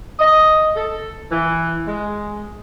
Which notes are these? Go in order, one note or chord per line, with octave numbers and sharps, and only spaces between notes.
D#5
A4
E3
G#3